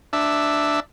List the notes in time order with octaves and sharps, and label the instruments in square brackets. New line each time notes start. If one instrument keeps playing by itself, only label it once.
[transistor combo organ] D4 E5